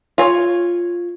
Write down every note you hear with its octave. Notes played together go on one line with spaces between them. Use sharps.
F4 C#5